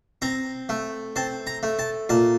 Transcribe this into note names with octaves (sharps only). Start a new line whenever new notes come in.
C4 A#5
A3
C4 A5
A#5
A3
A5
A#2 A5